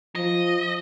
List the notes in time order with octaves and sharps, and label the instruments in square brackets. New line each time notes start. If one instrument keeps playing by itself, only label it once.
[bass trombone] F3 [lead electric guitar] D#5